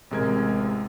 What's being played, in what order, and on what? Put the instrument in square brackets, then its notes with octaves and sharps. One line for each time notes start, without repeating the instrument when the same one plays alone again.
[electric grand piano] A1 C3 G#3 A#4 G#6